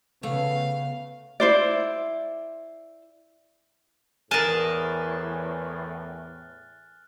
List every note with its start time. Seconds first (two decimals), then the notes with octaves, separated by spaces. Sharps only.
0.23 C#3 A3 B3 F5
1.40 E4 C5 D5
4.31 E2 A2 G#4 A#4 A5 F6 F#6 A6